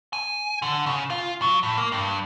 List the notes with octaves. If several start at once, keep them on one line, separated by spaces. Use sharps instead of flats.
G#5
D3
C#3
F4
F#3
A2
A#3
G2